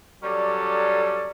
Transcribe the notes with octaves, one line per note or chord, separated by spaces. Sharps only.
F#3 G3 C#4 A4 D5